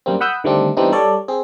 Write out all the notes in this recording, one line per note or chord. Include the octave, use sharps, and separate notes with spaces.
F#2 G3 A#3 C4
F#5 B5 D#6 E6 F#6 G6
D3 D#3 G3 A3 C4 D4
E3 G3 B3 C4 D4 D#4
G3 A4 C#5 D5
C4 G#4